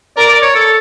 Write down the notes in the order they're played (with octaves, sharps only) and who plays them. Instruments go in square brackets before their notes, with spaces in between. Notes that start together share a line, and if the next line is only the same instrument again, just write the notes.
[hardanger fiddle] A#4 [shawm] D5
[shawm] D5
C#5
A4